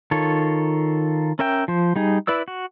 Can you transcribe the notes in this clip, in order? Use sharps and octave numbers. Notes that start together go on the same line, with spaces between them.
D#3 F4 A4 C#5
C#4 A#4 E5 G5
F3 C5
G3 D#4 G#4
E4 B4 D5 E6
F#4